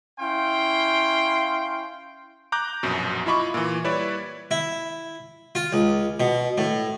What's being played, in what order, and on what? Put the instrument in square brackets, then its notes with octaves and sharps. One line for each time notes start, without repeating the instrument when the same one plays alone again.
[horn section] C#4 E4 F5 G5 C6
[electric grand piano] A#5 D6 F#6 G6
A#1 F#2 B2
E4 F4 D#5 B5 C#6 D6
A#2 E3
G3 E4 B4 C#5 D5 E5
[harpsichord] E4
F4
C#2
B2
A2